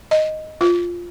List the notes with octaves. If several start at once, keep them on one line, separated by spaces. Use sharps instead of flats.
D#5
F4